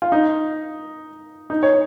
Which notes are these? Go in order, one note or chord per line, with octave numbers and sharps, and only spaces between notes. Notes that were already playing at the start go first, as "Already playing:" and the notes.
F4
D#4
D#4
C#5